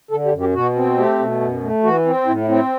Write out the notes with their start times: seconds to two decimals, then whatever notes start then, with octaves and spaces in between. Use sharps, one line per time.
0.11 D3 A4
0.25 G4
0.32 F#2
0.40 G4
0.54 B2 F#4
0.76 C4
0.97 A3 G4
1.19 B2
1.41 F#2
1.61 A3
1.83 E3 F#4
2.06 C4
2.26 A2 E4
2.41 E4
2.49 C4
2.55 E4